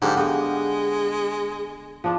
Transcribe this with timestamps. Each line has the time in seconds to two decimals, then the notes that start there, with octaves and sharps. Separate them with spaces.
0.02 G#2 D3 G4 F5
0.17 G#3 B3
2.04 E2 F3 D4 F4